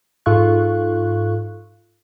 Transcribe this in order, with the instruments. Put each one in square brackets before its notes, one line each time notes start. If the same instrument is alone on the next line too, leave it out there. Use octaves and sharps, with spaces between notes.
[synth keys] G#2 F4 A4 F5 C#6 F#6